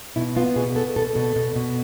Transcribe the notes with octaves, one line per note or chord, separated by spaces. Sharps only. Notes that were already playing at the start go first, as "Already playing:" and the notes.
B2 E4
B3 F4
B2 G#4
B3 A4
B2 A4
B2 A4
B2
B2